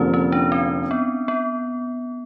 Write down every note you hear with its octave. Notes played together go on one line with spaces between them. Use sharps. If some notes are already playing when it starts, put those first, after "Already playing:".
Already playing: F1 F2 D3 F3 A#3 C#4
C#4
D4
C4
B3
B3